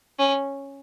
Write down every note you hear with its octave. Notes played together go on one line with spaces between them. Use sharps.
C#4